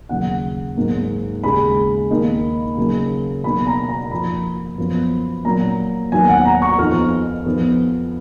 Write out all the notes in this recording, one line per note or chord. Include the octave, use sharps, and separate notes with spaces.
D#2 C#3 F#3 F#5
G#2 F#3 A#3
D#2 C#3 G#3 B5
D#2 D#3 A#3 D#4
C#3 F#3 A#3
B2 F#3 A#3 D#4 B5
A#5
A#5
F2 F3 A#3 B5
F#2 F3 B3
A#2 F#3 A#3 A#5
D#2 D#3 F#3 B3 G#5
F#5
A#5
C#6
F2 F3 B3 D#4 F6
F2 F3 B3 D#4